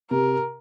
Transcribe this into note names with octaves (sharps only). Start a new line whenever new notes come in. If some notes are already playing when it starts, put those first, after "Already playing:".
C3 A#4